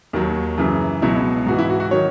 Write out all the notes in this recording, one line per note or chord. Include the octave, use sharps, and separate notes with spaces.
D#2 D#3 F#3
F#2 C#3 E3
C#2 B2 F#3 E4
G#2 E3 F#4
E4
F#4
F#4
D#3 F#3 C#5